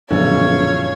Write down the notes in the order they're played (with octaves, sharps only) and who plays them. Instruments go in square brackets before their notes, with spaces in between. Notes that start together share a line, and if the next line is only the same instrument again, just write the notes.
[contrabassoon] E1 [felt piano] A#1 F#2 [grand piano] D3 F3 [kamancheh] C#5 F5